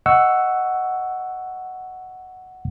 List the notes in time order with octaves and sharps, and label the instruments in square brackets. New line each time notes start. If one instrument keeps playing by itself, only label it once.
[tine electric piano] D#5 F#5 C#6 E6